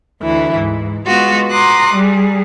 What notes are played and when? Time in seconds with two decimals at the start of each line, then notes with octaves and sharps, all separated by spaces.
0.22 D2 E3 E4
0.57 G#2
1.06 G#3 B3 F4 F#4
1.50 A#5 C6 D6 D#6 F#6
1.96 G3 G#4